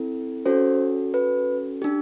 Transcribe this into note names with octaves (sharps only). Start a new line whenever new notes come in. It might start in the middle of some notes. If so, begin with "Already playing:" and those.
Already playing: C4 E4 A4
C#4 F#4 A4 C5
B4
D4 G4